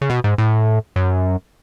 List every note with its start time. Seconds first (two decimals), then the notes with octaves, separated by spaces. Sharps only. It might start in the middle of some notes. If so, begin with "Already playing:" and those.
0.01 C#3
0.10 B2
0.24 G#2
0.38 A2
0.96 F#2